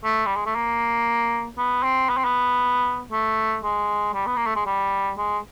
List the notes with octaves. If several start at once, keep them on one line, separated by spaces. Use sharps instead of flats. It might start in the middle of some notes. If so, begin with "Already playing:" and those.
A3
G3
G#3
A3
A#3
B3
C4
B3
C4
B3
A3
G#3
G3
B3
A#3
A3
G#3
G3
G#3